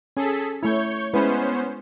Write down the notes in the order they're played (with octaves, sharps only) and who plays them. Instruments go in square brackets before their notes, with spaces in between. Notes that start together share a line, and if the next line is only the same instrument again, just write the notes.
[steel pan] C#4 [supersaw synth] G#4 A4 B6
[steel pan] A3 E4 [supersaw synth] C#5 C#6 G6
[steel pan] G#3 E4 B4 [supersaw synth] B3 C#4 C5